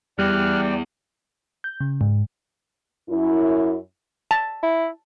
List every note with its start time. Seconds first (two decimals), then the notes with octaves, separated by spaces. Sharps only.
0.19 E2 G3 D5 G5 F6 F#6
1.64 G6
1.81 C#3
2.01 G#2
3.10 F#2 E4
4.31 A5
4.63 E4